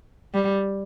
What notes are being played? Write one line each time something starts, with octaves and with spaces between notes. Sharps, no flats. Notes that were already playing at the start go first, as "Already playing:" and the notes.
G3